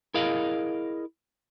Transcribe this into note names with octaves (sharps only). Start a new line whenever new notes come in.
E4 G#4 A#4 D#5 F5